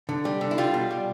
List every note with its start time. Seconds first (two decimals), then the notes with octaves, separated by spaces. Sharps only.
0.09 D3
0.25 G3
0.41 D3
0.51 E4
0.58 G3 F4
0.74 B2
0.91 G3